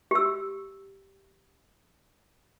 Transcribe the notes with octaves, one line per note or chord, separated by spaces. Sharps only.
G4 E6